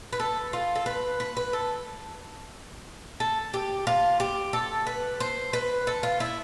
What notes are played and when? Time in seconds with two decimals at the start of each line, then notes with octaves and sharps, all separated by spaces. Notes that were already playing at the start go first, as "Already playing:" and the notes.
0.13 B4
0.20 A4
0.53 F4
0.75 A4
0.86 B4
1.20 B4
1.37 B4
1.53 A4
3.20 A4
3.54 G4
3.87 F4
4.20 G4
4.53 A4
4.87 B4
5.20 C5
5.53 B4
5.87 A4
6.03 F4
6.20 E4